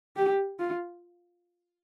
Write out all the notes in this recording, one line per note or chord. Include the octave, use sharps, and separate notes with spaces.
G4
F4